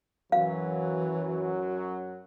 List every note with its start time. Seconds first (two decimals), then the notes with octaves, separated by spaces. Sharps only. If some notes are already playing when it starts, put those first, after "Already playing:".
0.32 F#2 E3 F#3 F5